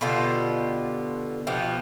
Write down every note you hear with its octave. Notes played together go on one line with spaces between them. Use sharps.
B2 D3 F4 G4
B2 F3 G4